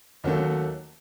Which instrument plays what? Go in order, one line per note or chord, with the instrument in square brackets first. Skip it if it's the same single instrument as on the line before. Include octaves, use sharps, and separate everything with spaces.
[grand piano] D#2 D#3 F#3 A3 C#4